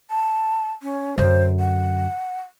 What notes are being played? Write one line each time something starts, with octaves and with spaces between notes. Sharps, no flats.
A5
C#4
F#2 D3 C5
F#5